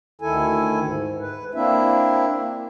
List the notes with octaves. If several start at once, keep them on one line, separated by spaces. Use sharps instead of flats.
D2 D#3 E4 A4 G#5
G#2
B4
A#3 C4 D4 E4 E5